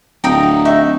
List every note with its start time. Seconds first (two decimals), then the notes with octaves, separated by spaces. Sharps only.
0.24 D1 G5 A#5 D#6
0.65 D#4 E5 C#6